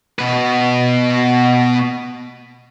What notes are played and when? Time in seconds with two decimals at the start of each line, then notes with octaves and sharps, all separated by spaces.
0.19 B2 B4